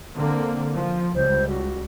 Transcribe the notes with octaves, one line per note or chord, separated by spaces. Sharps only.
D3 A#3 C4
F3
C#2 G3 C5
F#4